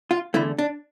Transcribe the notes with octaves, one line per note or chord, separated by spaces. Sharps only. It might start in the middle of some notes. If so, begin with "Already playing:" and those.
F4
E2 D3 A3 E4
D4